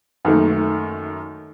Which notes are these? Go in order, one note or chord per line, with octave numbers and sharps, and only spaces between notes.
F#2 D#3 A3 A#3